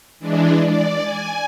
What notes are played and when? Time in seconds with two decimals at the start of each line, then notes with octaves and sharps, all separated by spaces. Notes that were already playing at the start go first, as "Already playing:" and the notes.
0.20 E3 G#3 D4
0.62 D5
1.01 G#5